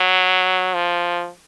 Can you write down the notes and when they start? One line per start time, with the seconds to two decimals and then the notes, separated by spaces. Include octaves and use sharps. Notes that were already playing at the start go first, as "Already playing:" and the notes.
Already playing: F#3
0.75 F3